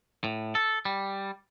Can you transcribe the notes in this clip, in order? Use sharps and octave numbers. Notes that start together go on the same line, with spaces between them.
A2
A4
G3